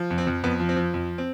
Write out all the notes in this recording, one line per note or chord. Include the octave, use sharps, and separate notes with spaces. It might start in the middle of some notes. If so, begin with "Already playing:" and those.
Already playing: F3
F2
C4
F2
F2 B3
F3
C4
F3
F2
C4